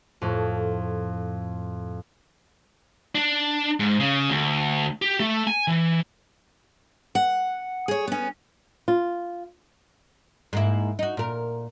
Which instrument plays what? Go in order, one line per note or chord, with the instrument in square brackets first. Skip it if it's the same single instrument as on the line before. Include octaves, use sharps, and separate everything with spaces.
[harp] F2 A2
[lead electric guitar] D4
G#2
C#3
D2
G4
A3
G#5
E3
[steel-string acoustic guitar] F#5
G#4 C#5
B3 C#4
[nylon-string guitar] F4
[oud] G#2 A#3 E4
D#4 F#4
A#2 A#4